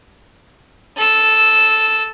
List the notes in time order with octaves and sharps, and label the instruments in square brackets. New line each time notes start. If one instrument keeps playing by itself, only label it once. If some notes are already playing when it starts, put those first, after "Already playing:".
[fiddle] A4 E6